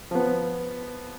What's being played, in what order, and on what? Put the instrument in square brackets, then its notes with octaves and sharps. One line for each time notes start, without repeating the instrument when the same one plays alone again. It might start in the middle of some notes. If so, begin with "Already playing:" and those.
[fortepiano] F3 B3